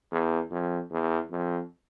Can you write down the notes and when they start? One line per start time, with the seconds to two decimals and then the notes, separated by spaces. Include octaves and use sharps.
0.12 E2
0.51 F2
0.91 E2
1.31 F2